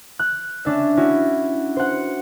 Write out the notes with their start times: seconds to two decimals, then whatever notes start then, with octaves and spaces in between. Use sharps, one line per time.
0.19 F#6
0.65 C#4 D4 E5
0.97 C#4 E4 F#4
1.76 C5 F#5